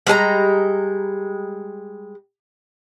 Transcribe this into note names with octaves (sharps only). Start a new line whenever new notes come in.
G3 G#3 G#5 A#5